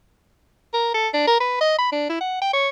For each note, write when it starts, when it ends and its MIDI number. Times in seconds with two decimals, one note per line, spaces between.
0.74 0.93 70
0.94 1.08 69
1.14 1.26 62
1.27 1.37 70
1.40 1.58 71
1.61 1.78 75
1.79 1.87 83
1.92 2.09 62
2.09 2.18 64
2.21 2.40 78
2.41 2.49 79
2.53 2.69 73